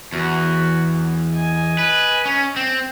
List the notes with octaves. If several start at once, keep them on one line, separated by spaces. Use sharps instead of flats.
E2 F#4
D#5 G#5
B4
C#4
C4